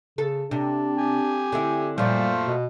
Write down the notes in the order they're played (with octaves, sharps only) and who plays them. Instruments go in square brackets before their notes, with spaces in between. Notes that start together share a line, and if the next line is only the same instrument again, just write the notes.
[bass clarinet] C#3 [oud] A4
[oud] C3 [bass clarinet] D4
[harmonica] G4 G#5
[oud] D3 C4 E4
[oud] F#2 A#2 F3 [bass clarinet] G3 [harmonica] A3 C5 F5
[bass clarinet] B2